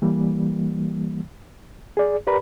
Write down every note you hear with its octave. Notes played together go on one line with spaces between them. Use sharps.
E3 G3 A#3
G#4 D5
G4 A#4 B4 D5 A#5 B5